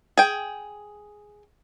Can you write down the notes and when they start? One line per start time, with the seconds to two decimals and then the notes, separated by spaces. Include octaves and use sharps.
0.17 G#4 G5